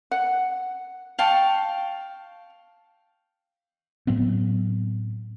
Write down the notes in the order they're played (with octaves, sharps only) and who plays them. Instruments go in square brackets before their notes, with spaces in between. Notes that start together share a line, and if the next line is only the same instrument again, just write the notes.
[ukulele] F#5
[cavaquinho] F5 G5 A5 C#6
[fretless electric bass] A2 F#3 B3 C4